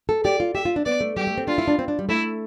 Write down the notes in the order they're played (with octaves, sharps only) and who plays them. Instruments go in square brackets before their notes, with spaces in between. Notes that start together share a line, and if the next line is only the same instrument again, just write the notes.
[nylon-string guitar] A4
[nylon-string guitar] G4 [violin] D5
[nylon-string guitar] F4
[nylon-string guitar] G4 [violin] E5
[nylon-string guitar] F4
D4
[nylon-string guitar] B3 [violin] D5
[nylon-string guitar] A3
[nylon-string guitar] G3 [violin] G4
[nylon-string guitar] A3
C4
[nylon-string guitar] D4 [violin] F4
[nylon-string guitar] E4
D4
C4
D4
G3
[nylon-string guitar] A3 [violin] E4